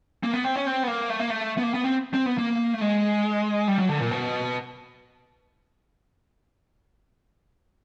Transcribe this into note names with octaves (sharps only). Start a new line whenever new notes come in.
A#3
B3
C4
C#4
C4
B3
A#3
A3
A#3
A3
B3
A#3
B3
C4
C4
B3
A#3
A3
G#3
G3
F#3
D3
A#2
B2